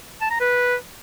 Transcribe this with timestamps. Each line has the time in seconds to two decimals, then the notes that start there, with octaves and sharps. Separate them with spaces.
0.21 A5
0.31 A#5
0.40 B4